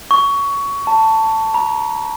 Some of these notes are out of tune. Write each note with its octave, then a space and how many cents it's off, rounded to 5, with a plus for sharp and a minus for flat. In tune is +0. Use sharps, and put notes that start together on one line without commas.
C#6 +15
A5 +10
A#5 +40